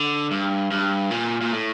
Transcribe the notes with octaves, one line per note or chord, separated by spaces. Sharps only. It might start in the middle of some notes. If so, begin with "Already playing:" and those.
Already playing: D3
G2
G2
A#2
A#2
A2